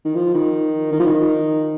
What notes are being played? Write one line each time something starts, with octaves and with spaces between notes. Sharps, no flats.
D#3
F3
D#3
D#3
F3
D#3